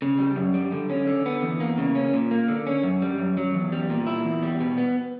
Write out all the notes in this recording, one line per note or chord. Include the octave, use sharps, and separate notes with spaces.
C#3
G3
F#2
G3
D3
C#4
D3
B3
E2
A#3
C#3
C#4
A#2
A#3
D3
C#4
F#2
G3
F#2
F#3
E2
G3
A#2
E4
E2
G3
B2
B3